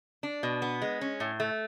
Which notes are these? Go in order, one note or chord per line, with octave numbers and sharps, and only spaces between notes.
D4
B2
B3
G#3
C#4
A2
A3